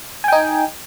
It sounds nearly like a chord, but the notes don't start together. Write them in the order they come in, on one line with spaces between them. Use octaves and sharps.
G#5 G5 D#4